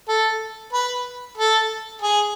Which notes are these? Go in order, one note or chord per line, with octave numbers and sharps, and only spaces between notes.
A4
B4
A4
G#4